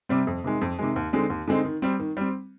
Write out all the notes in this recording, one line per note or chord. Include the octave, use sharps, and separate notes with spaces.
C3 G3 C4
F2
C3 D#3 G#3
F2
C3 D#3 G#3
D#2
D3 G#3 C4 D#4
D#2
D3 G#3 C4 D#4
D#3
G3 C4
D#3
G3 C4